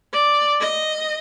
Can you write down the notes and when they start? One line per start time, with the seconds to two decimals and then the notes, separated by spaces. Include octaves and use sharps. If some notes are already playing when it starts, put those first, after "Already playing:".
0.13 D5
0.61 D#5